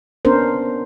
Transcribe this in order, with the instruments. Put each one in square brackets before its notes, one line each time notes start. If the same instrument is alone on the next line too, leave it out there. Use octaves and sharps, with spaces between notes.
[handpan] B3 C#4 D4 A#4 C5